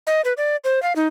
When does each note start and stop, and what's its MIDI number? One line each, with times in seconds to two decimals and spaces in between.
0.07 0.21 75
0.25 0.33 71
0.37 0.56 74
0.64 0.82 72
0.82 0.93 77
0.96 1.07 63